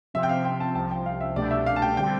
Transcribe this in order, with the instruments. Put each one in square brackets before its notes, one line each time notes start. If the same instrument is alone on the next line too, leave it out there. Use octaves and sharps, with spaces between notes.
[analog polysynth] C3 F3 C4 [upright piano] E5
[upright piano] G5
F5
G5
A5
[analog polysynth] C2 C3 F3 [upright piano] A5
[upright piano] G5
F5
E5
[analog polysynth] C2 B2 A3 D4 G4 [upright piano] D5
[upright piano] E5
F5
A5
G5
[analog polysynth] D3 G3 C4 [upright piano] G5